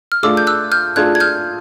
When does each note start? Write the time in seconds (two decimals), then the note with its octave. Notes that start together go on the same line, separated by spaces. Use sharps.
0.12 F6
0.23 A3 D4 F4 G#4 D6 E6
0.37 G6
0.47 E6 F#6
0.72 F6 G6
0.96 A3 D4 F4 G#4 F#6 G#6
1.15 G#6
1.20 F6 G6